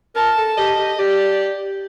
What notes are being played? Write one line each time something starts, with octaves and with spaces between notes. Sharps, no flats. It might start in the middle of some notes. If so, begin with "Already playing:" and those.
A#4 A5
A4
G4 D#5
G4
G4 D5